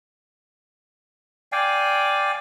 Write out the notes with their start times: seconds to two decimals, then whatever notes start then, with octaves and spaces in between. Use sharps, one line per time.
1.52 D5 F5 G5 G#5